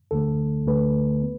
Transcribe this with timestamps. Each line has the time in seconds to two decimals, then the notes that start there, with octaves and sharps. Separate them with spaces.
0.11 D2 D3 A3 A4
0.67 D2 D3 A3 B4
1.23 B3